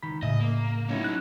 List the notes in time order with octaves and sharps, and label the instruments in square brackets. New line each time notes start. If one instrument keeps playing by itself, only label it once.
[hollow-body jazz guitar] C#2 D#3 B5
[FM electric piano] A2 [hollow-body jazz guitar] C#3 E5 [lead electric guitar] D#5
[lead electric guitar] A#3
[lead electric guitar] F#3 D#4 [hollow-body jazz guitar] A3 C#4 E4
[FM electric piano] F#6